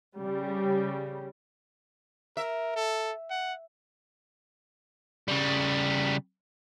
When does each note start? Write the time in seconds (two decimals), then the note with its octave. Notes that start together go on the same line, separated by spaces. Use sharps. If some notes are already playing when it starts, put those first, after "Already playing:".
0.17 C#3 G3
2.37 A#4 E5
2.76 A4
3.30 F#5
5.28 C#3 G3